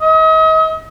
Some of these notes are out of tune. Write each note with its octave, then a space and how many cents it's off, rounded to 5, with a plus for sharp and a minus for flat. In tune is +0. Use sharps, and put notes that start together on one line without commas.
D#5 +40